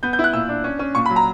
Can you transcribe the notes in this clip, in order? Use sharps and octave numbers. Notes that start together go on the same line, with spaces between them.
B3 G6
G6
E4
F#6
A#2 E6
D4
C#4
C#4
A#2 C#6
B5
F#3
A#5